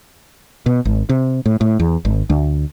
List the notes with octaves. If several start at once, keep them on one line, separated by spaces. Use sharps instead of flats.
B2
G#1
C3
A2
A2
E2
G#1
D2